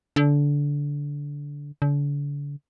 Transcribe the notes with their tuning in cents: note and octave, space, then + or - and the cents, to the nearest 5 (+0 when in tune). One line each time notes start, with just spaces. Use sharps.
D3 -20
D3 -40